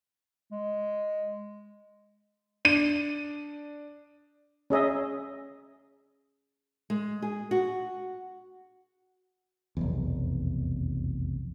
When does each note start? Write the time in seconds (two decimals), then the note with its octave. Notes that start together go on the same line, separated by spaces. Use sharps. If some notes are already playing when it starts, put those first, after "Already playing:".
0.52 G#3
2.65 D4 D#7
4.70 C#4 G#4 D#5 E5
6.90 G#3
7.22 G#4
7.51 F#4
9.77 F1 B1 E2